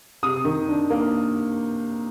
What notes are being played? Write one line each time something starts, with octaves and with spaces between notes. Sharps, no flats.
C3 D#6
D#3
D4
A#3